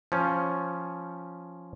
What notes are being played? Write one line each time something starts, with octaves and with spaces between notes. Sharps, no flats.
F3 C#4